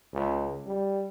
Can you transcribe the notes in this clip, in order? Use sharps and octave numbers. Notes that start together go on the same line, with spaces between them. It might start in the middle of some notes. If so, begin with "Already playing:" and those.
C#2
G3